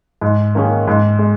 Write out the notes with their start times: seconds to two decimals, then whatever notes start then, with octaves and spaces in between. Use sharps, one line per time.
0.21 G#2
0.55 D#3 A#3 C#4 G#4
0.87 G#2
1.19 G#3